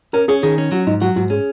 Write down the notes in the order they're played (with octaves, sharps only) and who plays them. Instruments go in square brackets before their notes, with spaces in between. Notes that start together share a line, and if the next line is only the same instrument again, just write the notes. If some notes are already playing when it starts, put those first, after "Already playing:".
[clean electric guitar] C#4 [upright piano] A#4
[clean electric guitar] C#4 [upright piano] G#4
[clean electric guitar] D#3 [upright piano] G#4
[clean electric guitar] C#4
[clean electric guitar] F#3 [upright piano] F#4
[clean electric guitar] G#2 [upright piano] D#4
[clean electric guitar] F#3 [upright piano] F#4
[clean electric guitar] G#2 [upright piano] F#4
[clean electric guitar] C#4 [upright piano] G#4